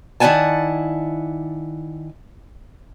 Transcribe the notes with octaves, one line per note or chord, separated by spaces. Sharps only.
D#3 E4 D5 F#5 G#5 A5